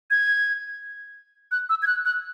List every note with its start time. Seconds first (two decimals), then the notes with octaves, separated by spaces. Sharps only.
0.11 G#6
1.52 F#6
1.69 E6
1.82 G#6
1.87 F#6
2.05 F#6